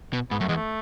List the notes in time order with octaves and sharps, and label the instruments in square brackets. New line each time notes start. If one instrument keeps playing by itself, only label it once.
[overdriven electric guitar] B2
[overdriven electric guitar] G#2 [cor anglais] B3
[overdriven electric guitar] F#2 [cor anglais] A3
[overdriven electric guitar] E2 [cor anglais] G#3
[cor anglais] A3